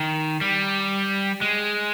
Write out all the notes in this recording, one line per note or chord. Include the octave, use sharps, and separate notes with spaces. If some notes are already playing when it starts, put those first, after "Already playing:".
Already playing: D#3
G3
G#3